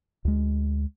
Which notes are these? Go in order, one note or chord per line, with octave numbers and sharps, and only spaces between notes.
D2 G#3